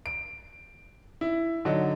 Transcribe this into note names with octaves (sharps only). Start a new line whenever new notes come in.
D7
E4
D3 F#3 D#4